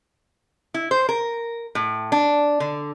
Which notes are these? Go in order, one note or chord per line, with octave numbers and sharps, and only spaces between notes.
E4
C5
A#4
A2
D4
D3